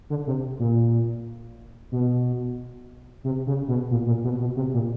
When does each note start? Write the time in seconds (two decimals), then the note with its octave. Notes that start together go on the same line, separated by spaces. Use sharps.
0.10 D3
0.27 C3
0.59 A#2
1.92 B2
3.24 C3
3.47 C#3
3.68 B2
3.91 A#2
4.07 A#2
4.24 B2
4.40 B2
4.56 C3
4.74 A#2